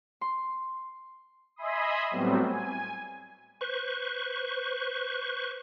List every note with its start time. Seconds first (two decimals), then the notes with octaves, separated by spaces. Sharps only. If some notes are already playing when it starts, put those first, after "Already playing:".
0.21 C6
1.56 D#5 E5 G#5 B5 C6 D#6
2.11 A2 F#3 G3 B3 C4
2.45 G#5
3.61 B4 C5 C#6